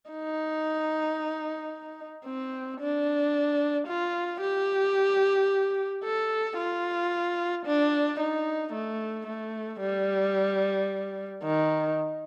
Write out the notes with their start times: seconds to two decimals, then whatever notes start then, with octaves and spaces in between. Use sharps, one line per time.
0.10 D#4
2.26 C4
2.80 D4
3.87 F4
4.42 G4
6.04 A4
6.57 F4
7.66 D4
8.20 D#4
8.73 A3
9.27 A3
9.81 G3
11.43 D#3